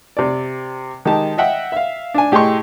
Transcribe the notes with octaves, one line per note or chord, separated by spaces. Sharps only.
C3 D5
D#3 G#3 G4 A5
D#5 E5 F#5 G5
E5 F5
D4 G#5
A2 G4 G#4 D#5 C6 C#6